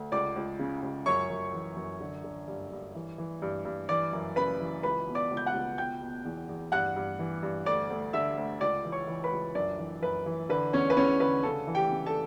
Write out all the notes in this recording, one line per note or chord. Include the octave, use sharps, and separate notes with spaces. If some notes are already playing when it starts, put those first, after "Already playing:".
Already playing: D2
C#2 D5 D6
C#2
C#3
C#2
F#2 C#5 C#6
F#2
E3
F#2
D3
D3
G2
G2
E3
E3
G2
G2
E3 D5 D6
F#2
C#3 B4 B5
E3
C#2 B4 B5
B2
D5 D6
C#2
G6
F#5 F#6
C#2
B2 G5 G6
B2
E2
E2
G2 F#5 F#6
G2
E3
G2
D2 D5 D6
D2
D3 E5 E6
D2
C#2 D5 D6
E3
C#5 C#6
E3
B4 B5
C#2
F#2 D4 D5
E3
F#2 B4
E3
D3 B4
E2 C#4 C#5
B4
E2 C#4 C#5
D3 B4
C#3 A4
E3
G4 G5
C#3
A4 A5